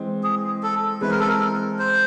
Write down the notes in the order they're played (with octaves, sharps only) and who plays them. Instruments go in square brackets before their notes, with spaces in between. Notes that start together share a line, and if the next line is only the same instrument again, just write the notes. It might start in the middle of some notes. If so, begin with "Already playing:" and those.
Already playing: [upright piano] E3 G#3 C4
[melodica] G#4
A4
[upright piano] E3 G#3 C4 E4 G#4 [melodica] B4
[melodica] A#4
A4
A#4
C5